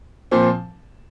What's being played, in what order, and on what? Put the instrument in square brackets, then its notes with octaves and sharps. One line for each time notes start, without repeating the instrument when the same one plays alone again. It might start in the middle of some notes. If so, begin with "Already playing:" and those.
[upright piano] A#2 F3 C4